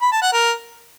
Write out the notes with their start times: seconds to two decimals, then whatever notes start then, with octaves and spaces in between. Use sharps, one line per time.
0.02 B5
0.12 A5
0.22 F#5
0.33 A#4